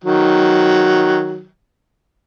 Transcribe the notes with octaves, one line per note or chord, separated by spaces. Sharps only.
D#3 F#3